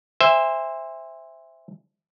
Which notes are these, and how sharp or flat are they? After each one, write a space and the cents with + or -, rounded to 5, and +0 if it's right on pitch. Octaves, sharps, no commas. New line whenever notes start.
C5 +0 E5 +0 G#5 -35